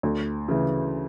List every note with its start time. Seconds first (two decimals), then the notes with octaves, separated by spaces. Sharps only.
0.03 D2
0.48 C#3 E3